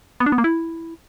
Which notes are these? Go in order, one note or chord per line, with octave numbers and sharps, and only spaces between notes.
B3
D4
B3
A#3
E4